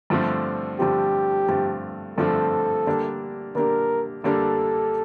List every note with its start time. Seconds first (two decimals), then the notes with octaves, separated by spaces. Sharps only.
0.10 G2 D3 F3 A3 C4
0.79 G2 D3 F3 A3 C4 G4
1.48 G2 D3 F3 A3 C4
2.18 G2 D3 F3 A3 C4 A4
2.86 D3 G3 A#3 D4 G4
3.55 D3 G3 A#3 D4 G4 A#4
4.24 D3 G3 A#3 D4 G4 A4